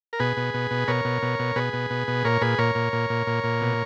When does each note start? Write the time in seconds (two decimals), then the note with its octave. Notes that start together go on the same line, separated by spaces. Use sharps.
0.13 A#4
0.19 B2 G#4 B4
0.37 B2
0.54 B2
0.71 B2
0.87 B2 A#4 C#5
1.05 B2
1.22 B2
1.39 B2
1.56 B2 G#4 B4
1.73 B2
1.90 B2
2.08 B2
2.25 A#2 A#4 C#5
2.41 A#2 G#4 B4
2.58 A#2 A#4 C#5
2.75 A#2
2.93 A#2
3.10 A#2
3.27 A#2
3.44 A#2
3.61 B2